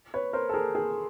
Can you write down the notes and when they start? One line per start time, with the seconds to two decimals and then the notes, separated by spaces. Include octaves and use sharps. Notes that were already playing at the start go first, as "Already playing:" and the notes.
0.14 B4 C#5
0.33 A#4 C5
0.49 A4
0.54 G#4 A#4
0.75 G#4 A#4